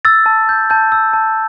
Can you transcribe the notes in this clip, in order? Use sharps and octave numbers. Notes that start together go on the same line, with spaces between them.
E6 A6
A5
G6
A5 G6
E6
A5